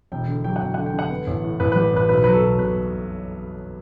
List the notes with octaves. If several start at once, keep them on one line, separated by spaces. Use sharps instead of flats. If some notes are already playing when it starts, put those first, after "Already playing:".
E1 G5
D3
F#3 G5
F#5
E1 G5
D3 F#5
G5
D3 F#5
B3
A1
A2
A1 B4
G3 B4
A1 B4
B1 B4
F#3 B4
A4
B1
B2 B4